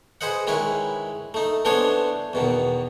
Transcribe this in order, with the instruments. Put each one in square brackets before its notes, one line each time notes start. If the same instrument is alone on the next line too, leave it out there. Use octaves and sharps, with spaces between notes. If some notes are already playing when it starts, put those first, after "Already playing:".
[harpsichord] G#4 B4 C5 D#5 F#5
D#3 G#3 C#4 E4 B4
A3 D#4
E3 A3 B3 D4 C5 C#5
E2 B2 D#3